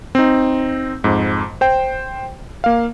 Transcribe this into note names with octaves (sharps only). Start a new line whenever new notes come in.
C4 D#4
F2 G#2
C5 G5
A#3 F5